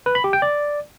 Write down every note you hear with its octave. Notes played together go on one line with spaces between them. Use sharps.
B4
B5
G4
G5
D5